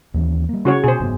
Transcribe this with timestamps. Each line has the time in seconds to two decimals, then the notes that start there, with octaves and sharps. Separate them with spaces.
0.14 D#2 E3 C#4
0.49 G3 A#3
0.65 C#3 F#4 C#5
0.84 B2 G#4 C5
1.00 F#1 G#2 B3